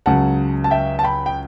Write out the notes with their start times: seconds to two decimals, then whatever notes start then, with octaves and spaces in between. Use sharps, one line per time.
0.06 C#2 C#3 F#3 F#5 A5
0.64 A5
0.71 E5 G5
0.99 A5
1.03 G5 B5
1.26 G5